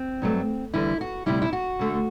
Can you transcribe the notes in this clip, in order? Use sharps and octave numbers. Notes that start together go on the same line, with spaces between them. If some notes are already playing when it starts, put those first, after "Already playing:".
Already playing: C4
G2 F#3 A3
E2 D3 G3 E4
F#4
D2 C3 G3 E4
E4
F#4
D2 D3 A3